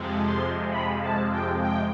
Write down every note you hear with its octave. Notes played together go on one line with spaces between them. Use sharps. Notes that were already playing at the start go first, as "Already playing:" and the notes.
Already playing: F2 C3 F3 G#3
C6
B5
A5
G5
G5